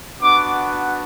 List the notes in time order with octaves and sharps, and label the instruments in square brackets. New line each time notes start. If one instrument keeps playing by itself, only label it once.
[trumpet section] B3 D4 F#4 D6